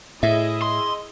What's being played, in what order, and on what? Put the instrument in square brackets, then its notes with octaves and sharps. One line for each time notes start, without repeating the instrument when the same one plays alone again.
[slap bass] A2 [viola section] E4 G#4 D#5 [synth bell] E5
[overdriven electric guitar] C6